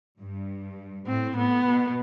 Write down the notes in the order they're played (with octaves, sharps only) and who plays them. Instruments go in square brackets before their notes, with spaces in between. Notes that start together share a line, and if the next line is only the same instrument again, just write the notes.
[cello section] G2
[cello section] A2 [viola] C4
[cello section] A2 [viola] B3
[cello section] B2